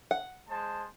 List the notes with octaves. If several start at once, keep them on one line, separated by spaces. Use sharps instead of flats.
F#5
G#3 C5 A5